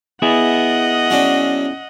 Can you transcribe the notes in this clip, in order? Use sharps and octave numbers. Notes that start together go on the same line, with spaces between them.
B3 E4 G#4 D#5 F#5
F#3 C#4 D4